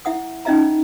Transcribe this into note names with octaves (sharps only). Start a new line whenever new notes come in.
E4 E5 F#5 D#6
C#4 D#4 F4 D#5 E5 A#5